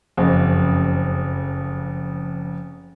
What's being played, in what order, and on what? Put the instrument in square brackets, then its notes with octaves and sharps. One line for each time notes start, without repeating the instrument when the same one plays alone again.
[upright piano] F#1 F2